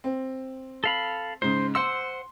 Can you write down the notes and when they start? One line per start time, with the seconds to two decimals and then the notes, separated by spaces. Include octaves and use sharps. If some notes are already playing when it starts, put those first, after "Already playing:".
0.04 C4
0.84 A4 F5 B5
1.42 G#2 C#3 C5
1.75 C5 F#5 C6 E6